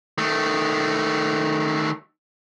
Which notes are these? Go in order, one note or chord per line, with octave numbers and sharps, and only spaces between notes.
D#3 A3